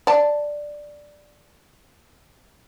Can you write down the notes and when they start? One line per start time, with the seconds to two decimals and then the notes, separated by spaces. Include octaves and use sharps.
0.07 D5 A5